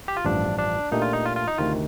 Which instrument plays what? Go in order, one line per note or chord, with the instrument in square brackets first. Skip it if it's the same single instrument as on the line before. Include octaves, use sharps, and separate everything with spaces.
[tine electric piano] G4
F4
[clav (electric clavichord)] A1 G2 F3 [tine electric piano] D4
[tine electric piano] D4
[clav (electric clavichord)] A#2 A3 D4 G4 [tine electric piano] D#4
[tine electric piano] F4
D#4
F4
F4
D#4
[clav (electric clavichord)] D2 C3 D#3 [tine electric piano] F4